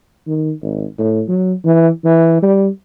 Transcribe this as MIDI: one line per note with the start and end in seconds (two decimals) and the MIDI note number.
0.27 0.52 51
0.62 0.85 32
0.98 1.23 45
1.28 1.53 54
1.64 1.89 52
2.04 2.42 52
2.42 2.69 55